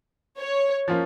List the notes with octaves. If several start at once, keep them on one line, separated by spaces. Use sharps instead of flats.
C#5
F3 A#3 C#4 F4